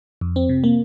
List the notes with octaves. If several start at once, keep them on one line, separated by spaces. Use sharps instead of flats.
F2
C4
C3
A#3